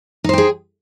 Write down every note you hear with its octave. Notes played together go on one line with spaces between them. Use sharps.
D#4 G#4 C5 G5